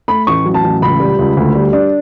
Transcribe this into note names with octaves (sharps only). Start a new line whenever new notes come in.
A3 B5
A1 C#6
F#3
A5
A1
C#2 B5
G3
C#2
D2
G3
D4